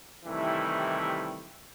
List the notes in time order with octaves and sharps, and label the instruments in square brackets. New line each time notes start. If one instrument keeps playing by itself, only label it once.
[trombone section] C3 D#3 E3 G3 A3 E4